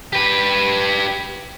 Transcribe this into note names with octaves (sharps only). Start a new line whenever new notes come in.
G4 B4